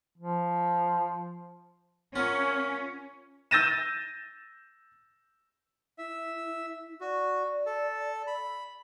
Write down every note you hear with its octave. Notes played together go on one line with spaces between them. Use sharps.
F3
A#3 C#4 F4 F#4
E6 G6 A6 A#6 D#7 E7
E4 E5
F#4 D5
A4
B5